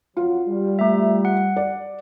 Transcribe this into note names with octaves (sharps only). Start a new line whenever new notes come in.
F2 F#3 F4 F#5
G3
A3 E5
F#5
D5